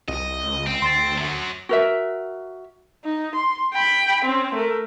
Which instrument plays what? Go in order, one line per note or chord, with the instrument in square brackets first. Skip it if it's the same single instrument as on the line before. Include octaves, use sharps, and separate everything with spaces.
[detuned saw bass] C2 [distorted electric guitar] D#5
[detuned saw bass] C#2
[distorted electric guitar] C4
[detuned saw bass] D2 [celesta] C6 A6
[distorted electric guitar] F#2 F#3
[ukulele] F#4 A#4 E5
[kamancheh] D#4
C6
G5 B5
C4 C#4
A3 A#4